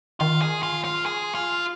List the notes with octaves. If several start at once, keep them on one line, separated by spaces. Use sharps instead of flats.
D#3 F4
G#4
F4
F4
G#4
F4